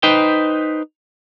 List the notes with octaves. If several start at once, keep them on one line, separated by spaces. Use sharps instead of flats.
D#4 B4 C5 G5